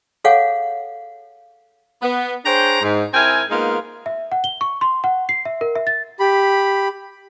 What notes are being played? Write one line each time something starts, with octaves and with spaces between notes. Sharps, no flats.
G#4 A4 C#5 F5 F#5 G#5
B3
D4 G#4 C5 C#5 G5 A#5
G#2
C4 E4 A#4 G5 G#5
G#3 A#3 B3 D#4 F4 A#4
E5
F#5
G7
C#6
C6
F#5
C7
E5
A#4
E5
A6
G4 B5